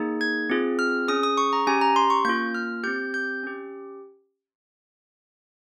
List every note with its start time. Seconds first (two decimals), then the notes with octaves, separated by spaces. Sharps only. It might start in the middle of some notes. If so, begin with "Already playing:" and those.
Already playing: A#3 D#4 G#4
0.21 G#6
0.50 C4 F4 G#4
0.79 F6
1.08 C#4 G#4 D#6
1.23 D#6
1.38 C#6
1.53 A#5
1.67 C#4 G4 G#5
1.81 A#5
1.96 C6
2.10 C#6
2.25 A#3 C#4 F4 G6
2.55 F6
2.83 C4 G4 G6
3.14 G6
3.43 C#4 G4